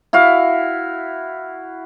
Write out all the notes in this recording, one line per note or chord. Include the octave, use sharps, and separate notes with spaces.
E4 F#4 F5